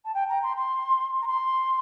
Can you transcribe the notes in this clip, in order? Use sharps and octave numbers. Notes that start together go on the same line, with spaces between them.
A5
G5
A#5
C6
C6
A#5
C6